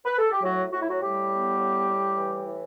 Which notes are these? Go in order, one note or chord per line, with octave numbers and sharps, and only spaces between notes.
B4
A4
G4
A2 F#3 F#4
A2 F#4
E4
F#3 F#4
A2 G3 G4
B3
A2
A2
E3
A2